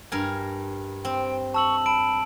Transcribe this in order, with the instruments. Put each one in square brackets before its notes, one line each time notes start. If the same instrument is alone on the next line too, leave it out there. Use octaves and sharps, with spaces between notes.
[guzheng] G2 A#4 G#5
[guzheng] C4 [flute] G5
[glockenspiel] A5 E6 F#7 [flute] C#6
[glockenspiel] A5 D7 [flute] B5